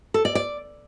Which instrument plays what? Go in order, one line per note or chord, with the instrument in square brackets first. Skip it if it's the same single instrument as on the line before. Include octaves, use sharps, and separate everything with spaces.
[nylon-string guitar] A4
D5
D5